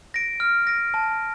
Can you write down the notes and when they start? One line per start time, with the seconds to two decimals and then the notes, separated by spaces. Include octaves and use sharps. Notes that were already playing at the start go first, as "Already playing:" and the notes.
0.14 A#6 D7
0.40 F6
0.67 A#6 D7
0.94 A5